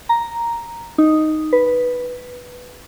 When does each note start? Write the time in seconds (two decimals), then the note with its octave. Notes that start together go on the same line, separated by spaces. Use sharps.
0.09 A#5
0.98 D#4
1.53 B4